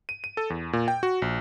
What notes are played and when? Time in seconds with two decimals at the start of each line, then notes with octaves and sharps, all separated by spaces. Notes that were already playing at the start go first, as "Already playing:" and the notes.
0.09 D#7
0.24 D#7
0.37 A4
0.50 E2
0.73 A#2
0.88 G5
1.03 F#4
1.22 A#1